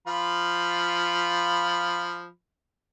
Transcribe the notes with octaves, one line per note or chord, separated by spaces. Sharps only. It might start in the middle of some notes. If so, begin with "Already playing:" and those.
F3 F4 B5